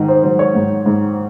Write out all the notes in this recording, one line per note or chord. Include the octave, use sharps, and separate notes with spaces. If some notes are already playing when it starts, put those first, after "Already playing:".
Already playing: G#2 D#3 D#4
C5
F#3 C5
C#5
G#2
G#2